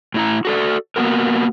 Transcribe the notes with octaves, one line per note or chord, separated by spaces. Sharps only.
A2 E4 A#5
F#4 A4 D5
A#3 B3 F#4 A#4